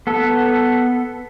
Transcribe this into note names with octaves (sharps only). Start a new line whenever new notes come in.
B3 A4